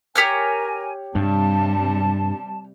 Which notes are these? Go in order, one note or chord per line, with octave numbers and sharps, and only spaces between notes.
G4 A#4 C#5 G#5 F6
G2 C3 G3 A5